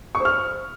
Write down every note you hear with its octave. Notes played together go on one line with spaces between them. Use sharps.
C#6
C5
F6